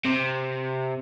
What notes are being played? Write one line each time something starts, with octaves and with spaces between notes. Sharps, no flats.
C3